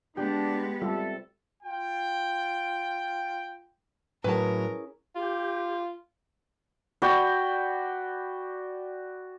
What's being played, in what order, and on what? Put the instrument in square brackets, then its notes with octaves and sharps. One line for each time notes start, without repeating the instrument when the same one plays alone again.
[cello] G#3 B3 [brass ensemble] D4 [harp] G4
[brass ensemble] C3 A4 [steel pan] G3 F4
[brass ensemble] F4 G5
[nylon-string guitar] A2 F#3 [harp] C#4 E4 G#4 [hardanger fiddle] A#4 [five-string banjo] B4 A5
[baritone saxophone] F4 [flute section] G4
[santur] F#4 D5 G5 B5